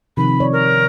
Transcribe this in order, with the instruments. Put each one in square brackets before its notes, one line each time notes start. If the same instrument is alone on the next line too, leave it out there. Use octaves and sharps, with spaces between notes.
[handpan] C3 D#3 F3 [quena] B5
[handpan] C#5 D5
[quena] A#4